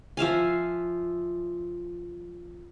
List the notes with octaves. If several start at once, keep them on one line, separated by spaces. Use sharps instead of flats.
F3 E5 F5 G#5